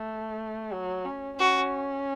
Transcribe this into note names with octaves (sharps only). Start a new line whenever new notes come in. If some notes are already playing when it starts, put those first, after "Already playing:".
Already playing: A3
F#3
C#4
C#4 F#4